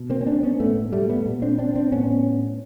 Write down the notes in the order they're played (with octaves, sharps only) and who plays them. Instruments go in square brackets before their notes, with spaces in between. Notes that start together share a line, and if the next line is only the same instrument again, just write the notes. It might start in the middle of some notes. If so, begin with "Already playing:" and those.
Already playing: [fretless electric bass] B2
A#3 C4
C#4
C4 D4
B3 C#4
A2 A3 B3
G3 A3
A3 B3
A#2
C4 D4
C4 D4
C4 D4
A2 B3 C#4